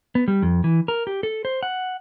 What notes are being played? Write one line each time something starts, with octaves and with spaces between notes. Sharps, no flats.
B3
G3
F2
E3
A#4
G4
A4
C5
F#5